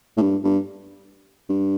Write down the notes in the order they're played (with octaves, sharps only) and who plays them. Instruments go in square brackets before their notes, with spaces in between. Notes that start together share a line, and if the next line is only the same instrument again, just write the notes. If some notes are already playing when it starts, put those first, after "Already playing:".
[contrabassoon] A2
G2
G2
G2